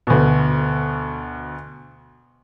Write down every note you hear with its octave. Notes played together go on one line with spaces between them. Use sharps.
D2 B2